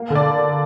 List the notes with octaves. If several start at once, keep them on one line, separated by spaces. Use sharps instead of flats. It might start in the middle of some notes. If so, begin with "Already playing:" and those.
Already playing: A#3
D3
D5